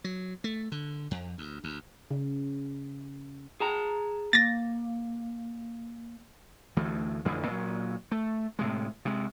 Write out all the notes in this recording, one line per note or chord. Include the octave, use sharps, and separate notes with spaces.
F#3
A3
D3
F2
D2
D2
C#3
G#4 A5 A#5
A#3 A6 A#6
D2 E3 A3
A1 F2 D3 E3
A#2 F#3
A3
A2 C3 G#3
C3 G#3